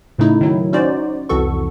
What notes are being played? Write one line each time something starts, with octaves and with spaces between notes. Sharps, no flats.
A2 C#3 A3 D#4 E4
D#3 F#3 E4
C#4 D#4 F#4 C5 D5
C2 F2 E3 F#4 A4 C#6